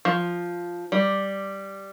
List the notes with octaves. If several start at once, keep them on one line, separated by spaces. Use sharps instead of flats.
F3
G3